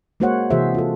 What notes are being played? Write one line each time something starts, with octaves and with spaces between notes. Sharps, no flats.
G#3 A#3 F#4 C5 C#5 F#5
C3 E3 F#4 G#4 C5 E5
F4 A4